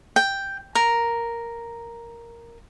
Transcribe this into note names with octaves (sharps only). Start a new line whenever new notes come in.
G5
A#4